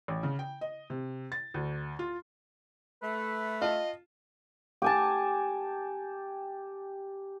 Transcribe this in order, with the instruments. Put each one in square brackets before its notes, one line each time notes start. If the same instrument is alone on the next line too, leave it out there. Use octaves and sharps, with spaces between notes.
[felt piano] A1
C#3
G5
D#5
C3
A6
D2
F4
[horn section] A3 [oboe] B4
[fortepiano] F4 A5 [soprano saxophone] D#5
[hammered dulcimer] G4 G#5 A5